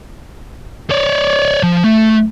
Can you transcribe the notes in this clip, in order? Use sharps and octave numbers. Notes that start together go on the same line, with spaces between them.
C#5 D5
F3
A3